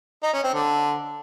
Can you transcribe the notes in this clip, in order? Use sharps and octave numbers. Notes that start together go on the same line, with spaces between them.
D#4
C#4
C4
D3